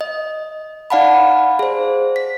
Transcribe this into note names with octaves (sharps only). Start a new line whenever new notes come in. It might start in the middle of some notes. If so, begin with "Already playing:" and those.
D#5
D#4 D5 F5 F#5 A5 B5
G#4 C5
B6